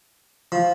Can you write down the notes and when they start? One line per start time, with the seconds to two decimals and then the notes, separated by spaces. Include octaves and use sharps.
0.52 F3